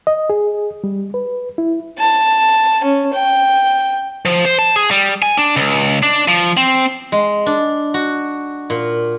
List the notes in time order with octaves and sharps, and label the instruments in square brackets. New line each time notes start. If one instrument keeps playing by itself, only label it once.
[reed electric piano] D#5
G#4
G3
B4
E4
[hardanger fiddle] A5
C#4
G5
[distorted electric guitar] F3
C5
A5
G#4
G3
G#5
D4
C#2
D4
F3
C4
[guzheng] G#3
D4
F#4
A#2